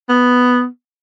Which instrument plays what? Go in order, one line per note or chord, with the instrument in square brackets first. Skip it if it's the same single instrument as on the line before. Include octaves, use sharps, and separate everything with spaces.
[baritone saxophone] B3